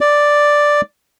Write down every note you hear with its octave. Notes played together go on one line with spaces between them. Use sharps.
D5